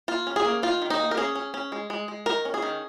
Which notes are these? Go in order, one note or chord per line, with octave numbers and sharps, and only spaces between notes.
A#3 F4
C#4
G#4
A#3
D#3 F4
D#3
D#4
A#3
A#4
C#4 G#4
C#4
C#4
G#3
G#3
G#3
D#3 A#4
C#4
G#4
D#3